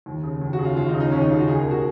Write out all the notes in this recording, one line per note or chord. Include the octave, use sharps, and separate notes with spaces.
D#2
C#3
D#2
F#4
C#3
F4
D#2 F4
D#4
C#3
D#4
D#2 C#4
D#4
C#3 F4
F#4
C#2 G#4
A#4
B2
F#4